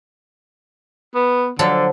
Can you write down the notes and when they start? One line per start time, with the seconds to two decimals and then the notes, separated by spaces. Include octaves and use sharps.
1.15 B3
1.59 D3 F3 F#3 A4